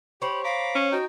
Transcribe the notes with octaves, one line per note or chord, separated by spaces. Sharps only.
G4 C5 C#5 B5
F5 A#5 B5 D6
C#4
D#4 F#4 G5